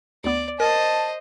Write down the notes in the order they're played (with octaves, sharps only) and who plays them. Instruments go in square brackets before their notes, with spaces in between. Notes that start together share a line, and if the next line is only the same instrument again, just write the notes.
[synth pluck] D2 B3 [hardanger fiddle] D5
[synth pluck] A#4 [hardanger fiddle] C5 D#5 [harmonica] A5